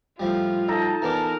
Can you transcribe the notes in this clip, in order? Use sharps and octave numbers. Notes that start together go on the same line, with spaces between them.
A2 F3 G3 F4
D#4 A4 A5 A#5
E3 B3 A#4 D5